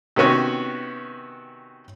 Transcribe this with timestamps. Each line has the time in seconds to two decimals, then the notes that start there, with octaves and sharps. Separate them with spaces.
0.16 C3 D#3 B3 C#4 F#4